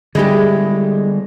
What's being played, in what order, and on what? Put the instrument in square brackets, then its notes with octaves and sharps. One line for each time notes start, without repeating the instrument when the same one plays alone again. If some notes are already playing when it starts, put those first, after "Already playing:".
[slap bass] D3 G3 [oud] G#3 E4 G4